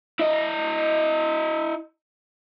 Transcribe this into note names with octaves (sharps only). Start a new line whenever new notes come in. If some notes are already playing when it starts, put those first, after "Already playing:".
E4 D#5